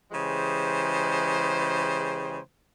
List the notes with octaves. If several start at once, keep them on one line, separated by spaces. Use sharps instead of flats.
C#3 E3 G#3 G4 C5